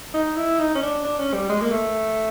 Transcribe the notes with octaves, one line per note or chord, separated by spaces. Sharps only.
D#4
E4
D#4
C#4
D4
D4
C#4
G3
G#3
A#3
A3